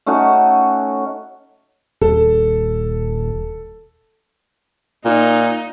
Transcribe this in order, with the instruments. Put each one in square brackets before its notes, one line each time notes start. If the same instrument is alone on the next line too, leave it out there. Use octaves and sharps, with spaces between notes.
[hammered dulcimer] A3 C#4 D#4 F#4
[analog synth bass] D#1 [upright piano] A4
[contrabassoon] A#2 [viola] D#4